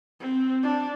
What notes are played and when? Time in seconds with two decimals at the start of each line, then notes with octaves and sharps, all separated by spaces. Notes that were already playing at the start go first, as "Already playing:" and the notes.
0.21 C4
0.63 D4